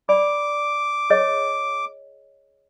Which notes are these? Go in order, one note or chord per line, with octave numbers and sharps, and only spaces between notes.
D5 B5 D6
G#4 C#5 D#5